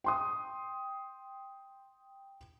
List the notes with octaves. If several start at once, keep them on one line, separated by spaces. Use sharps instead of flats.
G5 C6 D#6